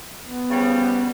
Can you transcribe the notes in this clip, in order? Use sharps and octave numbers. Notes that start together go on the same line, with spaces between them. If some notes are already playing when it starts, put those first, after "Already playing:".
B3
C#3 F3 G3